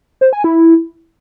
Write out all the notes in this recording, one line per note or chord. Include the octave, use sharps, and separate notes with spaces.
C5
G#5
E4